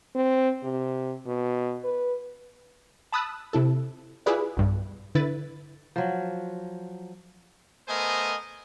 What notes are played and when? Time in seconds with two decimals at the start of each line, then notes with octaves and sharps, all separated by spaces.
0.15 C4
0.63 C3
1.26 B2
1.84 B4
3.12 A5 B5 D#6 E6 F#6 A6
3.53 C3 E4 A4
4.26 E4 F4 G4 G#4 B4 D5
4.57 B1 G2
5.15 D3 E4 B4 A6
5.96 F3 F#3
7.88 A3 B3 A#4 C5 D#5 G#5